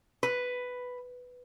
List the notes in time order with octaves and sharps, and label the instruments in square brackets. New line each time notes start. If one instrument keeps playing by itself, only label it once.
[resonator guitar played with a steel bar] B4